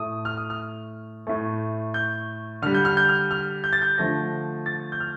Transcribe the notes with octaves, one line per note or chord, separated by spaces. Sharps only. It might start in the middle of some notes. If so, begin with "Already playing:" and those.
Already playing: A2 A3 D#6
F6
D#6
F6
A2 A3
G6
D3 G3 F6
G6
F6
G6
F6
F6
G6
A6
G6
D3 F3 A3 A#6
A6
G6
F6